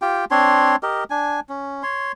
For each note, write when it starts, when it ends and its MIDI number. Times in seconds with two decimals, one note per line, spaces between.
0.02 0.25 65
0.02 0.25 67
0.02 0.25 79
0.31 0.76 60
0.31 0.76 62
0.31 0.76 73
0.31 0.76 84
0.83 1.04 67
0.83 1.04 70
0.83 1.04 75
1.10 1.40 62
1.10 1.40 80
1.49 1.83 61
1.83 2.12 73
1.83 2.12 84